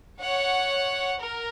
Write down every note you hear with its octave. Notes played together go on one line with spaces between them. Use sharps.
C#5 F#5
A#4